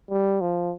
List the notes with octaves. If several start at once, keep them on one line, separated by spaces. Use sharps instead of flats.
G3
F3